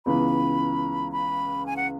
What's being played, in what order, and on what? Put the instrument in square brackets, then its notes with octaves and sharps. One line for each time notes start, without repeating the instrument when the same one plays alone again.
[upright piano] C#2 C#3 E3 B3 [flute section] B5
[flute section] B5
G#5
F#5